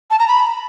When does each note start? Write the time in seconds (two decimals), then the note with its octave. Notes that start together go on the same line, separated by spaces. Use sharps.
0.10 A5
0.19 A#5
0.28 B5